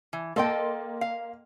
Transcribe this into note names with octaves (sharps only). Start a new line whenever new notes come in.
E3
A#3 A4 D#5 G5 C6
F5